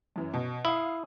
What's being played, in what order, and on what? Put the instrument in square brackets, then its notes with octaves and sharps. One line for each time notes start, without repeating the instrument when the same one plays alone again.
[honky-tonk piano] F#2 E3
B2
[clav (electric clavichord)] E4 [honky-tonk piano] F5 D#6